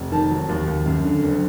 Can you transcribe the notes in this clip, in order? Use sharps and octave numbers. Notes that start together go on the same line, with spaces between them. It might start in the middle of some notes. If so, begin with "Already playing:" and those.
Already playing: F1
D#3 A5
F#3
D#2
D#2
F#2
D3
F#1